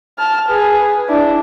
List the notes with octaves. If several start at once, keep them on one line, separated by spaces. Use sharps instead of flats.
A5 F6
G#4 B4
D4 E4